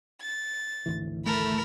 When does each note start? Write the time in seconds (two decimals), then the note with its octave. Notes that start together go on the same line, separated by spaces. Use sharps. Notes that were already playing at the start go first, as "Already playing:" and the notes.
0.21 A6
0.86 G#1 D2 E3
1.26 A3 A#4 A5 B5